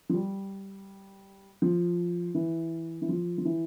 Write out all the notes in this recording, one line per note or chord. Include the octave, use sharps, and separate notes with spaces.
F3
G3
F3
E3
E3
F3
F3
E3